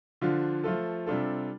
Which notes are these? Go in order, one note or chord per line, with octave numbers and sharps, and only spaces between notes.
D3 F3 D4 F4
F3 A3 F4 A4
C3 G3 D4 F4 A4